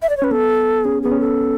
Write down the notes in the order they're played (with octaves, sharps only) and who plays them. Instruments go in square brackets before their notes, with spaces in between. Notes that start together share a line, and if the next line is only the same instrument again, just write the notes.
[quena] E5
D5
C#5
[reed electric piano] C#4 [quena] B4
[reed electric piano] B3 [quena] A4
[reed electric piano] C#4 [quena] G#4
[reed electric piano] B3 [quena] G#4
[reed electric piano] C#4
[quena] A4